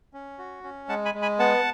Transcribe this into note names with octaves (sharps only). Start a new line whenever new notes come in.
C#4
F#4
C#4
G#3 F#5 A5
G#5 B5
G#3
G#5 B5
B3 F#5 A5